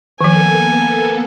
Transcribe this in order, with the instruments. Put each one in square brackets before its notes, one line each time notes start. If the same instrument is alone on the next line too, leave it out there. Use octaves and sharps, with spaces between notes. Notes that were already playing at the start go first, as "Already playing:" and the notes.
[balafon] D#3 F3 [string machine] A#3 B3 A4 [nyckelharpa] G#5